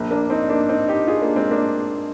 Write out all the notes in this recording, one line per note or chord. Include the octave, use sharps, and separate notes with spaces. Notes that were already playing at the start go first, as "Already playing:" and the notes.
Already playing: A#1 A#2
A#3 D4
C4 D#4
A#3 D4
C4 D#4
D#4 G4
F4 G#4
A#3 D4
G#3 C4
A#3 D4